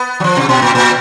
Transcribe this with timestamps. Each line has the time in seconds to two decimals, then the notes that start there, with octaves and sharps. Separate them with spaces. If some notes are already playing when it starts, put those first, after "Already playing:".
Already playing: B3
0.20 F#3
0.24 F3
0.37 C3
0.49 B2
0.62 A#2
0.75 A#2